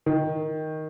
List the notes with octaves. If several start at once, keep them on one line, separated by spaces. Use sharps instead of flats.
D#3